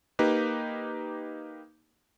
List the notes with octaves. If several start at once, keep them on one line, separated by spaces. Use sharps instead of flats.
A#3 D#4 G4 B4